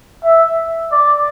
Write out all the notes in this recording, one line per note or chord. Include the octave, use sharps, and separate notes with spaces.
E5
D5